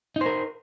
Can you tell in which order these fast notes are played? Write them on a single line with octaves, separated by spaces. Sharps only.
D#4 C5 A#4